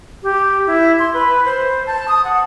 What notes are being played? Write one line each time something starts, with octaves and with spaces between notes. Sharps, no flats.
G4
E4
C6
B4
C5
A5
D#6
F#5